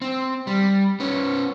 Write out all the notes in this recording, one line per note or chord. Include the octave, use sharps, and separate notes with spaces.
C4
G3
B3 C#4